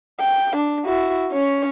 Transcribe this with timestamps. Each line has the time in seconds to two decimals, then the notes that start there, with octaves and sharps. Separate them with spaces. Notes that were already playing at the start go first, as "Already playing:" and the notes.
0.20 G5
0.56 D4
0.86 E4 F#4
1.32 C#4 C#5